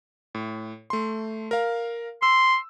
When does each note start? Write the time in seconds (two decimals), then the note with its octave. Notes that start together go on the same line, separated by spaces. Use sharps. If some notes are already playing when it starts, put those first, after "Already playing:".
0.35 A2
0.90 A3 C6
1.51 A#4 F5
2.22 C6 E6